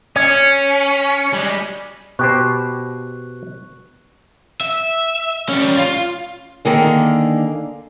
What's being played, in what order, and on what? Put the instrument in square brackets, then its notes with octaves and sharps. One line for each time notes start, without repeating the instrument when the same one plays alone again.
[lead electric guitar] C#4 [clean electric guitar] C#5
[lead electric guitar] G3 G#3
[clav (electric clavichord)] B2 G4 C5 [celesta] C#6 F#6
[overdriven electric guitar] E5
G3 C#4
F4
[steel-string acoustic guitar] D3 D#3 A#3 G#4